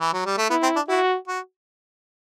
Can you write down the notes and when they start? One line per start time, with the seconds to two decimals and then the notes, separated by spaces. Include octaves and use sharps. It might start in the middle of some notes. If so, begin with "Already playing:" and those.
0.00 E3
0.13 F#3
0.25 G3
0.37 A3
0.50 B3 E4
0.63 C4
0.76 D4
0.88 E4 F#4
1.27 F#4